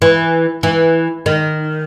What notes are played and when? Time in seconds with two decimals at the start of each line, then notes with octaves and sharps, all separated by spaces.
0.02 E3
0.63 E3
1.26 D#3